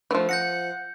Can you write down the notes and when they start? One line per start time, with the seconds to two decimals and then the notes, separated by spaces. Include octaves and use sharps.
0.11 E3 F3 A3
0.29 F#5 G6 A#6 C#7